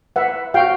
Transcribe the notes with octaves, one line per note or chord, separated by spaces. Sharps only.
B4 E5 F#5
F#4 F5 G5